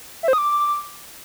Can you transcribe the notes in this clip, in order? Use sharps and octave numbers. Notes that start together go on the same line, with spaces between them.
E5
C5
D#6
D6